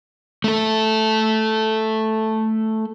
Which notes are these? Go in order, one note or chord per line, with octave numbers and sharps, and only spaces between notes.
A3 A4